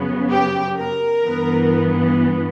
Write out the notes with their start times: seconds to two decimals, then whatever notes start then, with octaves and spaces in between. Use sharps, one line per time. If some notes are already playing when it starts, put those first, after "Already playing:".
Already playing: F#2 C#3 F#3 B3
0.30 G4
0.77 A#4
1.24 G2 E3 B3